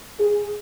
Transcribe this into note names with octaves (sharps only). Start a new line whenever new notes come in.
G#4